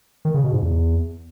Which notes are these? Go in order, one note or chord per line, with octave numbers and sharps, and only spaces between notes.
D#3
C#3
B2
G#2
E2